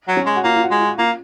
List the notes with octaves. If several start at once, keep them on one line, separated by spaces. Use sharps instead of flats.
F#3
C#4
G#3
F#4
A#3 F4
F4
F#4
G#3
F4
A#3 F4